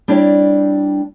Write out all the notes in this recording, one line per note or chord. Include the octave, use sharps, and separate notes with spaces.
G3 C4 D4 E4 C#5 D5